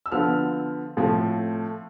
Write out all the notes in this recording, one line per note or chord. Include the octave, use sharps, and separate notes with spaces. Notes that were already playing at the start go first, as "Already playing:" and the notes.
E6
D3 F3 B3 F6
A2 F3 C4